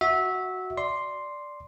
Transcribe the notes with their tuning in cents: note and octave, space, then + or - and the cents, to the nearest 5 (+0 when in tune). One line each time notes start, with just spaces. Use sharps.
F#4 +0 E5 -15
D5 +0 C6 +0